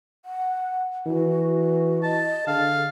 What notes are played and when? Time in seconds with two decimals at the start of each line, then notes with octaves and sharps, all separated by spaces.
0.25 F#5
1.06 E3 F#4
2.03 D#5 A5
2.47 D3 G#4 F5